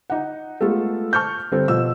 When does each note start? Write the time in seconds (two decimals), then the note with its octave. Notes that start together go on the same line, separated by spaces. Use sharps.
0.10 D#4 F#5
0.61 G#3 A3 B3 F4 A4
1.13 A5 C#6 F6 G6
1.52 G1 G3 C4 A4
1.68 B2 F3 E6